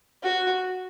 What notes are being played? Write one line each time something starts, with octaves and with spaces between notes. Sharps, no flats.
F#4